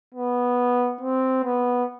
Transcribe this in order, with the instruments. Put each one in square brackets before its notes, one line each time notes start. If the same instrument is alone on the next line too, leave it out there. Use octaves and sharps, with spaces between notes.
[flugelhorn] B3
C4
B3